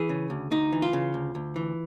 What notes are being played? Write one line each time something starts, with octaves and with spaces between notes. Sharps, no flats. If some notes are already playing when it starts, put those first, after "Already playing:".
Already playing: E3 G#4
C#3
D2
D2 D#4
E3
F4
C#3
D2
D2
E3